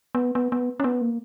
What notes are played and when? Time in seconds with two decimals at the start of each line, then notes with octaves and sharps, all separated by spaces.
0.15 B3
0.35 B3
0.52 B3
0.80 C#4
0.84 B3
1.01 A#3